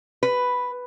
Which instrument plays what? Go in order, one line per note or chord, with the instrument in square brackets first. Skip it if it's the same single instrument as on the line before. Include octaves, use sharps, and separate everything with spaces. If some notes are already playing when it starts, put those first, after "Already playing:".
[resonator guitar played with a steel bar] B4